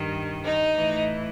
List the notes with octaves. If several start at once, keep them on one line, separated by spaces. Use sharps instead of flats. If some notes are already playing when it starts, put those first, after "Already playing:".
Already playing: G2 D#3
D#4
A2 E3